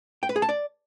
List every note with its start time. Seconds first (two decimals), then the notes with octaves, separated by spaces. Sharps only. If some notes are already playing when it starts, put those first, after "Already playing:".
0.23 G5
0.29 B4
0.36 G#4
0.42 A5
0.49 D5